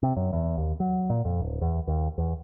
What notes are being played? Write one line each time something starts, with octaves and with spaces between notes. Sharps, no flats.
C3
F#2
E2
D#2
F#3
A#2
F2
D1
E2
D#2
E2